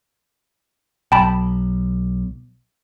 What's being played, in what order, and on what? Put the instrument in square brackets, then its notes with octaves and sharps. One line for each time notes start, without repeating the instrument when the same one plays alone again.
[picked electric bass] B1 [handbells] G5 A5 B5